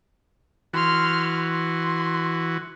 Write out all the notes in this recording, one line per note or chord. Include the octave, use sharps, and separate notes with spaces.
E3 F#4 C6 F6
C6